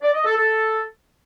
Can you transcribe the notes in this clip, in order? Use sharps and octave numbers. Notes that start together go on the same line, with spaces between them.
D5
D#5
A4
A4